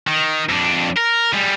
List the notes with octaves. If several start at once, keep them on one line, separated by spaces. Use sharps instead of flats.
D#3
F2 D4
A#4
G3 G#4